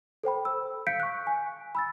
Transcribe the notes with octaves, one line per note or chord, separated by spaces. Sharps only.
A4 C5 G5 B5
E6
F5 G6 B6 C#7 D7
C#6 F#6
G#5
B5 E6 A6